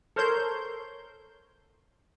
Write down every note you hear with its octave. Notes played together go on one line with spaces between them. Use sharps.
A4 A#4 C5 C#5 C6 G6